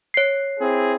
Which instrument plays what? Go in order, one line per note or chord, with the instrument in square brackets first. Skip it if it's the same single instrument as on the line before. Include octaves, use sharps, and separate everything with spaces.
[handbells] C#5 C7
[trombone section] C4 E4 G#4